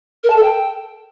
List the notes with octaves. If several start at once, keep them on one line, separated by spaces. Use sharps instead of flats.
A#4
A5
A4
G5